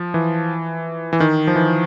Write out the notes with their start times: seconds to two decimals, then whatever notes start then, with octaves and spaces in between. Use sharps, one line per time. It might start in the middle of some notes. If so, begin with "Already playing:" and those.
Already playing: F3
0.14 E3
1.13 E3
1.20 D#3
1.47 F3
1.56 E3